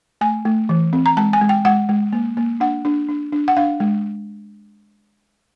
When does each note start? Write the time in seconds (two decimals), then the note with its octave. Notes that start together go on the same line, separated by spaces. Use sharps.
0.21 A3 G#5
0.45 A3
0.69 E3
0.93 C4
1.06 A#5
1.17 G#3 A5
1.33 G#5
1.41 G#3
1.49 G5
1.65 G#3 F#5
1.89 G#3
2.13 A#3
2.37 A#3
2.60 D4 F#5
2.85 D4
3.09 D4
3.33 D4
3.48 F#5
3.57 D4 F5
3.80 G#3